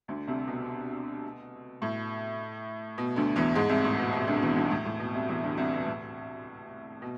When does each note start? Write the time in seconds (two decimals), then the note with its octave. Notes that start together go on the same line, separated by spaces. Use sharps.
0.08 D2 D3
0.27 C2 C3
0.47 B2
1.82 A2
2.98 B2
3.16 D2 D3
3.36 E2 E3
3.55 G#2 G#3
3.69 C2 C3
3.84 A2
3.99 B2
4.13 B2
4.27 D2 D3
4.42 E2 E3
4.56 D2 D3
4.71 A2
4.85 A2
4.99 B2
5.15 C2 C3
5.28 E2 E3
5.43 D2 D3
5.57 C2 C3
5.73 B2
5.86 A2
7.02 B2